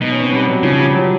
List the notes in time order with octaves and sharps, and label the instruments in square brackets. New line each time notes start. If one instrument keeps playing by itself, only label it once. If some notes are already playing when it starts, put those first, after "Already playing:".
[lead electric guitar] B2 [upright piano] D#4
[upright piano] C#4
C4
G3
F#3
[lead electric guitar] C#3 [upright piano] F3
[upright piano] G3
F#3